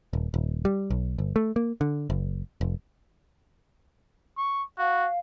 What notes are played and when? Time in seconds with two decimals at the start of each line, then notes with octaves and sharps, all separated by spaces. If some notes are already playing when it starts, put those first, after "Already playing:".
0.13 D#1
0.34 D#1
0.65 G3
0.91 B1
1.18 G1
1.36 A3
1.56 A#3
1.81 D3
2.10 F#1
2.61 F1
4.37 C#6
4.78 F#4 F5